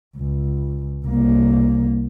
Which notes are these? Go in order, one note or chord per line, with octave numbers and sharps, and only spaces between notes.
C#2
C2 A#3